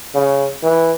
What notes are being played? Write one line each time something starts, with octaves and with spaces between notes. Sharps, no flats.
C#3
E3